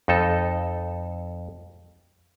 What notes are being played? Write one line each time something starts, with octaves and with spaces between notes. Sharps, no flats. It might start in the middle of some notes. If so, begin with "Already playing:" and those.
F2 D#4 A4